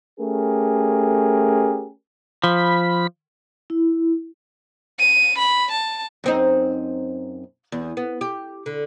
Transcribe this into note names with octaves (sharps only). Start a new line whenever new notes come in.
A3 C#4 G4 G#4 A#4
F3 B5
E4
D#7
B5
A5
F#2 C4 D#4
E2
B3
G4
D3